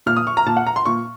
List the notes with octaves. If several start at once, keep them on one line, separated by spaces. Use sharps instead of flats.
A#2 F6
D#6
C#6
A#5
A#2 A5
F#5
A#5
C6
A#2 C#6